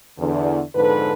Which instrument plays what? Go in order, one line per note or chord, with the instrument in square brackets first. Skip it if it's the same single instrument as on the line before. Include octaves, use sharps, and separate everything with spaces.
[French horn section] E2 D3
F2 G#2 D3 A4 B4